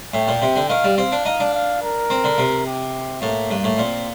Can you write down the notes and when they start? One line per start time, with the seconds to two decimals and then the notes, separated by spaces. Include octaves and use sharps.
0.14 A2 G5
0.28 A#2
0.42 C3
0.56 D3
0.69 D#3 F5
0.84 G3
0.98 C4 F5
1.12 D4
1.25 D#4 F5
1.40 D4
1.54 F5
1.82 A#4
2.10 C4
2.24 D3
2.38 C3
2.66 G4
3.22 A2 A#3
3.51 G2
3.64 A2
3.78 A#2 C4